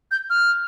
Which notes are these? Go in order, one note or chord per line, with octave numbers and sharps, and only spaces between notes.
G6
F6